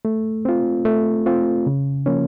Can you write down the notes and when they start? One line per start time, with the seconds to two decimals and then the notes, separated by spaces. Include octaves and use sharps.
0.05 A3
0.45 C4 F4
0.85 A3
1.26 C4 F4
1.66 C#3
2.06 F3 A#3 C#4